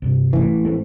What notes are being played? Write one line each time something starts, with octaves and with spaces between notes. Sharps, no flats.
C2 G2 C3
A1 E3
G#3 A3 C4